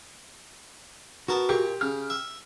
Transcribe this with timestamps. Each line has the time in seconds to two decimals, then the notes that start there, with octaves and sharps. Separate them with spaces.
1.28 B3 F#4 A#4 A5
1.49 A#2 G4 C#6
1.81 C#3 F6
2.10 E5